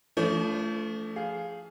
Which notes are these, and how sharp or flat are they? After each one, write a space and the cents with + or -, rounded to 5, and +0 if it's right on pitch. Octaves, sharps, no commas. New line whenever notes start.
F3 -40 A3 +0 C#4 +45
G#4 +0 F5 +0